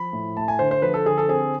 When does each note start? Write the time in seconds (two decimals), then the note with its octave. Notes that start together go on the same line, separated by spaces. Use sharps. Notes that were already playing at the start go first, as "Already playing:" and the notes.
Already playing: F3 B5
0.13 A2
0.36 A3 A5
0.48 G#5
0.59 D3 C5
0.71 C5
0.82 F3 B4
0.94 A4
1.06 D3 G#4
1.18 A4
1.29 C4 G#4